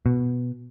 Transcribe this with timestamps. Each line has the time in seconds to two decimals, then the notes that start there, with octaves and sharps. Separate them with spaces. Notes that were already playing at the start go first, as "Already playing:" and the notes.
0.06 B2